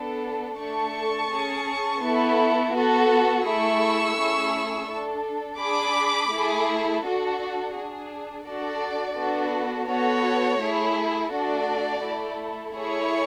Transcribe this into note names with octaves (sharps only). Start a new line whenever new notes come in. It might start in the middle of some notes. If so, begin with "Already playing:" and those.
Already playing: B3 D4 A4
A3 D4 A4 A5 C#6
C#4 G#4
B3 E4 A4
B3 F#4 A4
A3 E4 G#4 C#6 E6
A3 C#4 E4 G#4
D4 A4
D4 G#4 B5 D6
A3 E4 G#4
D4 F#4 A4
D4 G#4
D4 F#4 A4 D5
B3 D4 F#4 A4
B3 F#4 A4 C#5
A3 E4 G#4
A3 D4 F#4 A4 D5
A3 E4 A4
A3 E4 G#4 C#5